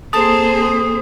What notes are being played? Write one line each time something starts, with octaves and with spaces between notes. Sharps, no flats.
A#3 C4 G#4 A4 C5 A5 D#6